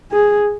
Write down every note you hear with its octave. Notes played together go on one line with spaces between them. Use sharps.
G#4